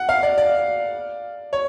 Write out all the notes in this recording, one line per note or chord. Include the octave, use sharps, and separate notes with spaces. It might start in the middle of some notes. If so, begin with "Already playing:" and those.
Already playing: F#5
F5
D5
D5
C#5